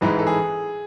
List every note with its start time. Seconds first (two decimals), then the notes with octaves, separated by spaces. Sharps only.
0.01 A1 G#2 E3 G#3 B4
0.19 A4
0.27 G#4